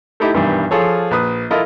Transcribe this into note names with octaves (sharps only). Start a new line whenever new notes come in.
A3 D#4 E4 G4
B1 G2 D#3 E3 G3
F3 F4 G#4 A4 C#5
A#1 B4 D#6
E4 F4 A4 A#4 D#5